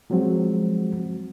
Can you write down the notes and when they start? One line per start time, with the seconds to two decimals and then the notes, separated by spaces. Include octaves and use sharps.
0.10 F3 F#3 G#3 C4 F#4